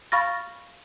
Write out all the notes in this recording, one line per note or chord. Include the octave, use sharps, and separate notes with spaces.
F5 B5 C#6 F6 A6 A#6